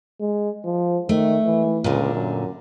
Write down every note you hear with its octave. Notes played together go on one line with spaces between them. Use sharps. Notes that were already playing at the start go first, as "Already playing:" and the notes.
G#3
F3
D#3 A3
E3
C#2 A#2 D3
F#2